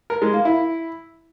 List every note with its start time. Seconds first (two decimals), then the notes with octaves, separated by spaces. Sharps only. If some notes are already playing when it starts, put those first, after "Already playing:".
0.10 A#4
0.22 G#3
0.33 A#3
0.45 E4